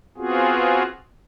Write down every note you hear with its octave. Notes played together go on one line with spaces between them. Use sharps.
B3 C4 F4 F#4 G#4